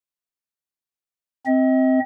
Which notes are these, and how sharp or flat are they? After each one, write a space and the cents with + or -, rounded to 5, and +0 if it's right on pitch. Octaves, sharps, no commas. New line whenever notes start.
C4 +0 D#5 +40